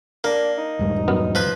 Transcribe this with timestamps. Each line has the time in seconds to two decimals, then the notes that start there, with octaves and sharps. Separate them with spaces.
0.24 A#3 D4 A#4
0.58 D#4
0.79 E1 G#2 G3
1.08 F#2 B3 A#4
1.35 F3 B4